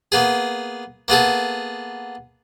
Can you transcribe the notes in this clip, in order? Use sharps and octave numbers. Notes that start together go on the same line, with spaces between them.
A#3 B3 G#4
A#3 B3 G#4 A4